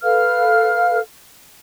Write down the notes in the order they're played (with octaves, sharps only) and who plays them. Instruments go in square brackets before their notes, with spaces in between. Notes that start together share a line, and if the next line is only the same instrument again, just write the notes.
[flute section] A4 B4 F5 F6